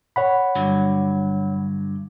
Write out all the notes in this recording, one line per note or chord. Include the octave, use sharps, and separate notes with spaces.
C#5 F#5 B5
G2 D3 F#3